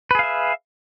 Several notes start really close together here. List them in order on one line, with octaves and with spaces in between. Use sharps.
B4 G#4 F5 E5